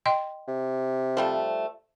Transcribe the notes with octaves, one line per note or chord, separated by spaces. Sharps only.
D#5 G5 C6
C3
F3 G3 A3